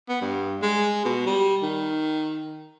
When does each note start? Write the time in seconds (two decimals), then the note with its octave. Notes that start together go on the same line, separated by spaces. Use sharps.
0.09 B3
0.21 G2
0.62 G#3
1.05 B2
1.26 G3
1.63 D#3